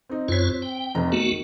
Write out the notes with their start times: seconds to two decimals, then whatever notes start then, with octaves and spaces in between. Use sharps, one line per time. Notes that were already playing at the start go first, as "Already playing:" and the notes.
0.09 C4 D#4
0.28 F#2 C4 F4 C#5 B6
0.62 G5
0.95 F1 F2 A#5
1.12 D#3 A3 B3 F#4